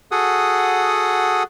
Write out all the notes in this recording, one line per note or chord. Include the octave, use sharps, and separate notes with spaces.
F#4 G#4 A4 F#5 D#6